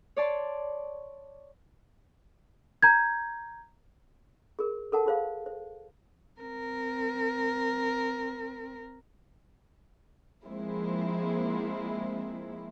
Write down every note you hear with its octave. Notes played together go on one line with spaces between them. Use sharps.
C#5 D5 A5 C6
A#5 G6 G#6
G#4 A#4
A4 A#4 F#5 A5
F4 G#4 C5 F5
C5
C4 A#4
F3 G#3 A#3 C4 E4